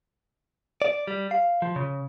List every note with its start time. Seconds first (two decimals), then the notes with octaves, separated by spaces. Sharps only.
0.82 D5
1.07 G3
1.31 F5
1.62 F3
1.76 C#3